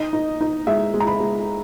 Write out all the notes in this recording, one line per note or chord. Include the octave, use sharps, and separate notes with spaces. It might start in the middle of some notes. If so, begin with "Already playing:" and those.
Already playing: D#4 D#5
D#4
D#4
G#3 E5
G#3
A#5
B5
G#3